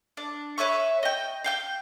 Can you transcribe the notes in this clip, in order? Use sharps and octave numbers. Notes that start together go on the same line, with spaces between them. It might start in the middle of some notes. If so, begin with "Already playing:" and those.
D4
B4 C#5 E5 C#6
D#5 G5
F5 G5 G6